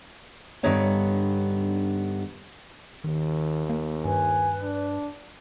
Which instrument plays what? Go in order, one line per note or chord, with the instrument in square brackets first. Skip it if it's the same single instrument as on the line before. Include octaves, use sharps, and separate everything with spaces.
[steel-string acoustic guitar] G2 D3 B3 D#4 C#5 F#5
[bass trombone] D#2 [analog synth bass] D#3
[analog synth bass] A#3
[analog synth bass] G2 [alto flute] B4 [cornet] G#5
[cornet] D4